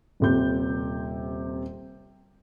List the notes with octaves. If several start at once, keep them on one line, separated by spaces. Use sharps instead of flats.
D#1 C3 G6